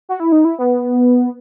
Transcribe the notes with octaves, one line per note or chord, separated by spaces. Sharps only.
F#4
E4
D#4
E4
B3